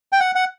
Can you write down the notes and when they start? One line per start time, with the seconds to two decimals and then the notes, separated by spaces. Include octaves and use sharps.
0.12 G5
0.20 F#5
0.35 F#5